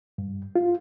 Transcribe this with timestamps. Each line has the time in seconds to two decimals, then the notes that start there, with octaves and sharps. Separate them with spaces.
0.18 G2
0.56 F4